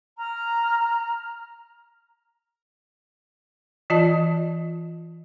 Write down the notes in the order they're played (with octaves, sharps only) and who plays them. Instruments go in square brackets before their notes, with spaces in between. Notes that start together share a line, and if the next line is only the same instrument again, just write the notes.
[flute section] A#5 F6
[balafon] E3 F4 D#5 A5